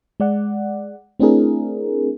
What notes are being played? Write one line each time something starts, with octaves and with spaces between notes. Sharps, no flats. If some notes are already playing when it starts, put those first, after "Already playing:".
G#3 D5 F#5
A3 C4 D4 E4 G#4 A#4